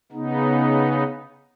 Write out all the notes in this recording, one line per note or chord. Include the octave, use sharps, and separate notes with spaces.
C#3 B3 D#4